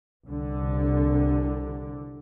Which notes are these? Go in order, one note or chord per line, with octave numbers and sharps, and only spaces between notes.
C2 D3